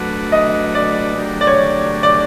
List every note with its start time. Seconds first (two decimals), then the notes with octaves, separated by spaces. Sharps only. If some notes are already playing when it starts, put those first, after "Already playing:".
Already playing: F#3 A3 D4 F#4 B4
0.32 D#5
0.75 D5
1.18 F#3 A3 D4 G4 A#4
1.41 D5
1.47 C#5
2.03 D5